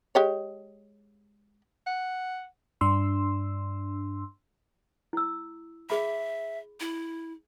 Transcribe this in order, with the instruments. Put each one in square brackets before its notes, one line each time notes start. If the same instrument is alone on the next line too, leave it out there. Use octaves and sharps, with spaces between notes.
[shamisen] G#3 G4 C#5
[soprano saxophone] F#5
[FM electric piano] G2 D4 C6 E6
[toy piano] E4 E6
[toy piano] G#4 B5 [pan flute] E5
[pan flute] E4